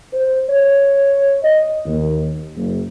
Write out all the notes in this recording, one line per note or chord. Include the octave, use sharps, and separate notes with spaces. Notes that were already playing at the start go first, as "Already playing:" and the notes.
C5
C#5
D#5
D#2
F#1